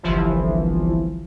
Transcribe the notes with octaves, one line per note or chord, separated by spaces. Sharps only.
G1 C2 E3 F3